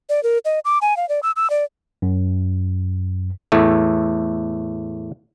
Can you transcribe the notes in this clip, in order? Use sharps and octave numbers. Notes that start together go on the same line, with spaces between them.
D5
A#4
D#5
D6
G#5
F5
D5
E6
E6
D5
F#2
E2 A2 A3